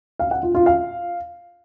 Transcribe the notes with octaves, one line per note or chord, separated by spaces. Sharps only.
F5
F#5
F4
F4
F5